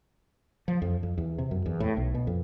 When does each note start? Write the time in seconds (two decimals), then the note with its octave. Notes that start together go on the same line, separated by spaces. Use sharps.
0.68 F3
0.82 F2
1.03 F2
1.18 E2
1.38 C3
1.51 F#2
1.66 E2
1.80 A2
1.97 B1
2.14 B2
2.27 F2